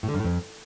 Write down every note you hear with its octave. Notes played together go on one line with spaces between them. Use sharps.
A2
D3
F#2
A2
F2